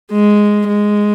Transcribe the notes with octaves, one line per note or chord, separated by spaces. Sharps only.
G#3
G#3